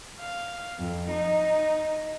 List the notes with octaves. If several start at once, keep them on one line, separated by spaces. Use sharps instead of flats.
F5
F2
D#4